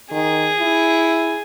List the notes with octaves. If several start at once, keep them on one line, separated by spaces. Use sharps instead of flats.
D#3 G#4
E4